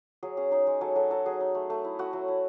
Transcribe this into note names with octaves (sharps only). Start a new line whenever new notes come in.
F#3 G#4
C#4 G#4
D#4 G#4
G#3
F#3 A4
F#3 A4
F#3 A4
F#3 G#4
D#4
A3
A3
E4
A3 F#4
F#3
E4